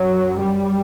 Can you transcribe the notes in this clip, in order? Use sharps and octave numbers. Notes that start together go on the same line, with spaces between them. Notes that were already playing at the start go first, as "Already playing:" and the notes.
Already playing: F#2 F#3
G3